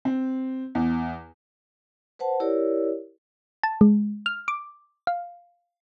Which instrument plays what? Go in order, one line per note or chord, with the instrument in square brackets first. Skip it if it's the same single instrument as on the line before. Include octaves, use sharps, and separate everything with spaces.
[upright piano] C4
E2
[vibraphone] B4 C5 F#5 A5
E4 G4 A#4 C#5 D5
[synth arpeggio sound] A5
G#3
F6
D6
F5